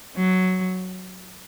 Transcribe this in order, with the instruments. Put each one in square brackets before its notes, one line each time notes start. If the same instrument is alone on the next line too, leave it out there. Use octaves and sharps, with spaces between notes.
[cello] F#3